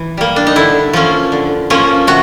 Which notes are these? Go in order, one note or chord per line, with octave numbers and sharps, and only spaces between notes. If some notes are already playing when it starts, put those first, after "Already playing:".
Already playing: E3
G3 A#3
D4
D#4
D3 E4
F3 A#3 C#4
D3
F3 A#3 C#4
C3 F#4